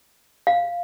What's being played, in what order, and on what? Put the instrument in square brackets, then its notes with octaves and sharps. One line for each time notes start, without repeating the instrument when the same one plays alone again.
[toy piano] F5